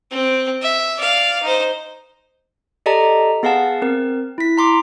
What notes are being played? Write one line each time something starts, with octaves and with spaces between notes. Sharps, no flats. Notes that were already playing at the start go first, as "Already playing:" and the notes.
C4
E5
D5 F5
D#4 C5
G4 A4 D5 D#5 A5 A#5
B3 G#4 F5 F#5 A5
C4 A#4
E4 B6
A#5 C6 D6